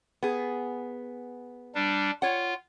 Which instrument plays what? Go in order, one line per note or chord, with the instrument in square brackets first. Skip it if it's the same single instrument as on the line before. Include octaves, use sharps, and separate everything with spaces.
[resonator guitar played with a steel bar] B3 G#4
[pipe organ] G3 D4
[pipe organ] F4 [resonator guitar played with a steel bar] C#5 F#5